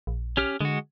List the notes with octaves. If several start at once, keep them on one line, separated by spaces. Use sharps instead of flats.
A#1
C#4 G4 F6
D3 G#3 F#4